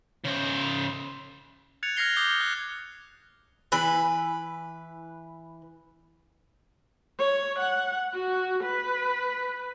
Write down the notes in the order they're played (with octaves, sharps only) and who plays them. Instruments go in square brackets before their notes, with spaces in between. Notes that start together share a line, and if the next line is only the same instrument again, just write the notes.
[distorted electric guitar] C#3 C5
[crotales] F#6 G#6 A6 C#7 F7
F6 G#6 A#6 C7 G7
D6 D#6 G6 A#6 G7
F#6
[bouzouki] E3 B4
[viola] C#5
F#5
F#4
B4